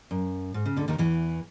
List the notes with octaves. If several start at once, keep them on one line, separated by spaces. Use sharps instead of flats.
F#2
G#2
C#3
D2 D3
D#2 D#3
E2 E3